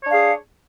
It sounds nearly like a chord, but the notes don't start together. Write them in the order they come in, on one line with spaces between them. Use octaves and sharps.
C#5 D4 F5 G#4